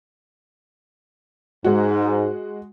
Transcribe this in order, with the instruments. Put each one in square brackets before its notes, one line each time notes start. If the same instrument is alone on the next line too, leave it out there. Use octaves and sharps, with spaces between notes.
[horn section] G#2 [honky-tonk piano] G#3 F#4